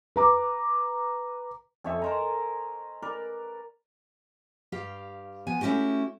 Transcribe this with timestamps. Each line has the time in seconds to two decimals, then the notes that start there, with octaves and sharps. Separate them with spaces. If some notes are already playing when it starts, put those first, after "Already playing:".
0.16 B4 A#5 D6
1.84 F2 A4 C#5 E5 G#5
2.02 A#4 C5 D#5 A#5
3.02 A#4 B4 D5
4.72 G2 G4 F5
5.47 F3 B3 G#5
5.61 A3 C#4 E4 F#4 G4